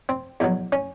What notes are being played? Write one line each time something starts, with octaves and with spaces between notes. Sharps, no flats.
C4
E2 B2 F#3
C#4